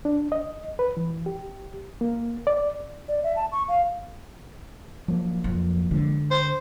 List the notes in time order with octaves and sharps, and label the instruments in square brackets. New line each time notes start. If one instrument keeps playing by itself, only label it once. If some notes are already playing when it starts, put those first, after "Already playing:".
[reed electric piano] D4
D#5
B4
E3
G4
A#3
D5
[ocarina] D5
E5
A5
C#6
F5
[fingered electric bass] F3 F#3 A#3
[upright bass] F2
[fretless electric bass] D3 [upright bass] G#3
[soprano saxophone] C5